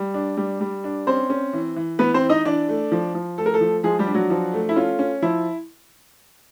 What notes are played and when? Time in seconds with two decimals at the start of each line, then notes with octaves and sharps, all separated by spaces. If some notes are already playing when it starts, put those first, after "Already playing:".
Already playing: G3
0.14 D4
0.37 G3
0.61 G3
0.84 D4
1.07 C4 C#4 C5
1.30 C#4
1.53 E3
1.76 E3
1.99 E3 B3 B4
2.14 C4 C5
2.22 E3
2.30 D#4 D#5
2.45 E3 D4 D5
2.69 A3
2.92 F3
3.15 F3
3.38 A3 A4
3.46 A#4
3.54 A3 A4
3.61 F3
3.83 F3 G#3 G#4
3.99 G3 G4
4.07 D4
4.14 F#3 F#4
4.30 F3
4.53 A3
4.69 E4
4.76 C#4 F4
4.99 C#4
5.22 F3 E4